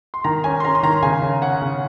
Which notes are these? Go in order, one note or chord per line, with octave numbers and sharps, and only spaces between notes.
C6
D#3 A#5
C#4 G#5
C6
C#4 A#5
C6
D#3 A#5
C#3 G#5
C#3
C#4 F#5
C#3